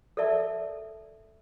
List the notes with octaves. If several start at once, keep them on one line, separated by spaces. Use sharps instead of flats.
A4 A#4 D5 E5 A5